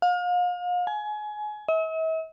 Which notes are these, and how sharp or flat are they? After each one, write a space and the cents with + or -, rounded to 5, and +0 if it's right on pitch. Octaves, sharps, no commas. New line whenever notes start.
F5 +35
G#5 +25
E5 -45